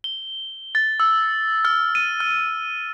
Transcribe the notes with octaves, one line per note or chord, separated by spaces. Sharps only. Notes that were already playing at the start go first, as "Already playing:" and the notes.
G7
A6
E6
F6
D#7
F6